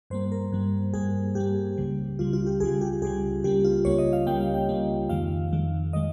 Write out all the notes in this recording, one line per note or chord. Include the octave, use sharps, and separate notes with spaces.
G2 G3 A#3 C5
A#4
G2 G3 A#3
G2 G3 A#3 G#4
G2 G3 A#3 G4
C#2 C#3 G3
C#2 C#3 G3 F4
F4
G4
C#2 C#3 G3 G#4
G4
C#2 C#3 G3 G#4
C#2 C#3 G3 A#3 G4
F4
C#2 C#3 G3 A#3 C#5
D#5
F5
C#2 C#3 G3 A#3 G5
F5
G5
C#2 C#3 G3 A#3
F2 D#3 G#3 F5
F2 D#3 G#3
D#3 G#3 D#5